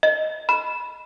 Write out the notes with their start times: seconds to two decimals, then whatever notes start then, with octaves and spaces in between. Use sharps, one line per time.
0.03 D#5
0.49 B5